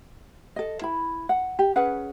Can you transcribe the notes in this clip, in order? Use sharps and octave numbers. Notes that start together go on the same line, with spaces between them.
A4 D#5
E4 B5
F#5
G4
C#4 G#4 B4 F#5